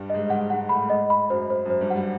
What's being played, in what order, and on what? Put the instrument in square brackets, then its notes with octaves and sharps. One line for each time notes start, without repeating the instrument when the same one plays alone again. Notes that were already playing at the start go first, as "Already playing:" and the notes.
Already playing: [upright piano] G2 G3
[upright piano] G#2 G#3 [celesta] D#5
[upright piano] G#2 G#3 [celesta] F#5
[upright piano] G#2 G#3 [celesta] F#5
[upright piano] A2 A3 [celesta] B5
[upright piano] G#2 G#3 [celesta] D#5
[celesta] B5
[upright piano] F#2 F#3 [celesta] C5
[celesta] C5
[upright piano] F#2 F#3
[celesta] C5
[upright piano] G2 G3
[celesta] F#5
[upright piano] G3